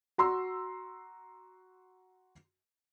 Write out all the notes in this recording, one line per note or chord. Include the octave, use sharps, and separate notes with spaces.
F#4 A#5 C6 E6